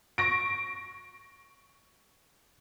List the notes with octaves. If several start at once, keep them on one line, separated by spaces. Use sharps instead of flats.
C#6 A#6 D7